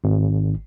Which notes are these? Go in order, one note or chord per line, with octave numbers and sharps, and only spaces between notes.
G#1